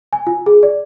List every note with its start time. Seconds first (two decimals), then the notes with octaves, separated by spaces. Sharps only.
0.13 G#5
0.27 F4
0.46 G#4
0.63 D5